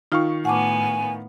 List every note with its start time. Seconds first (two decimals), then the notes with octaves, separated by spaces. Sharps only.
0.12 D#3 D#4 F4 F5 G5 C#6
0.45 A2 B3 F#5 G#5 A5 D6